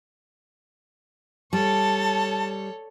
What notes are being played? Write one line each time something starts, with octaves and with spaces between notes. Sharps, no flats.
G3 A4 C#5 A5